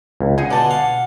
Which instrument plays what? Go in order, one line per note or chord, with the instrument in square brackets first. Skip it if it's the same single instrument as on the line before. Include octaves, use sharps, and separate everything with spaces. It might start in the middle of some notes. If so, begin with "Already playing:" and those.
[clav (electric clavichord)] C#2
[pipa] D#4 G#4 [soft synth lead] F#5 [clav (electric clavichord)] G#5
[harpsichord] B2 D3 [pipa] D5 A5
[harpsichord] F5 [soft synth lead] F#5